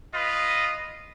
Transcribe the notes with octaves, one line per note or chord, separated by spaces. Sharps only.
F4 B4 D#5